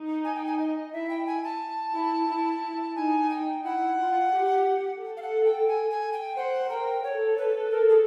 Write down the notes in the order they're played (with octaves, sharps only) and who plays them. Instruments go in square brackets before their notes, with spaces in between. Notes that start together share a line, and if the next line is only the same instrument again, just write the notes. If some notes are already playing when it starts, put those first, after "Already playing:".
Already playing: [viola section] D#4
[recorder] G#5
G5
G#5
D#5
[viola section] E4 [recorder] E5
[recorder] G5
G#5
A5
[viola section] E4
E4
[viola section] D#4 [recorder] G#5
[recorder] G5
[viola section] E4 [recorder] F#5
[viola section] F4
G4
A4
[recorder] F5
F#5
G5
G#5
G#5
G5
[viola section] C5 [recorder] F#5
[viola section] A#4 [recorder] G5
[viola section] A4 [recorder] C#5
[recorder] B4
A#4
G#4